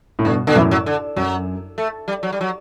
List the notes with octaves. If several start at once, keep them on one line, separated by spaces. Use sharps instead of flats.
A2
G2 B2 D3
B2 D3
F#2 A2 E3
F#3
D3
F#2 F#3
A3
G3
F#3
G3
F#3